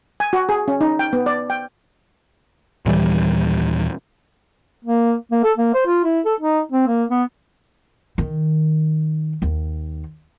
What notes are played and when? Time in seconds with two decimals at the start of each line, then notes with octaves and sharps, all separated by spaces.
0.20 G#5
0.33 F#4
0.49 G#4
0.68 C#4
0.81 D#4
0.99 G5
1.13 B3
1.26 D5
1.50 G5
2.86 D#2 A#2 E3 G3
4.84 A#3
5.32 A#3
5.44 A4
5.57 A#3
5.74 C5
5.86 F4
6.04 E4
6.25 A4
6.40 D#4
6.72 C4
6.87 A#3
7.09 B3
8.18 D#3
9.42 D#2